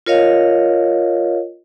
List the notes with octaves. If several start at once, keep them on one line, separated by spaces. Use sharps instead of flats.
F4 A#4 C#5 D#5 F5